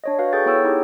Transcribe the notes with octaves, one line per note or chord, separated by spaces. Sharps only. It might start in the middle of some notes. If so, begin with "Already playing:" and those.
D4 C#5 D#5
F#4 B4 F5
G#4 A4 G5 C#6 G6 A6
B3 E4 G#4 C#5 G5 E6
D#4 E4 G4 G#4